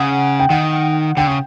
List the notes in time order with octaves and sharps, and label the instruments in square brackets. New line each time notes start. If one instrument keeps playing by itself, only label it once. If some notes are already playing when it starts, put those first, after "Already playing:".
Already playing: [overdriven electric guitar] C#3 [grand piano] F#5
[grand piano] G5
[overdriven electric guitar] D#3 [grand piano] F#5
[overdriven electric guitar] D3 [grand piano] G5
[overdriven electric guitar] C#3